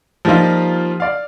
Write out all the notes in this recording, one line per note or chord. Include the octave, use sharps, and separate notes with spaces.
F3 G3 A#3 D#4 F4
D5 F5